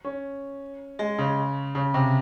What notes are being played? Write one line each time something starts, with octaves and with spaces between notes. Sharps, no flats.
C#4
G#3
C#3
C#3
C3